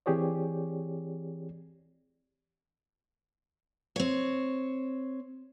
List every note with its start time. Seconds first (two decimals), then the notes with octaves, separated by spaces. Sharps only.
0.06 E3 C4 G4 G#4 C#5 D5
3.96 C4 C#5